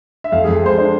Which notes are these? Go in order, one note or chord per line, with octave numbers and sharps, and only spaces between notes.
E5
F2 F5
G#4
F2
G#3 C5
D4